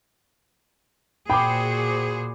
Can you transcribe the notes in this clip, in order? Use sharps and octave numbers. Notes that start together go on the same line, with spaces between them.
A#2 F#4 G#4 C5 G5 B5 D6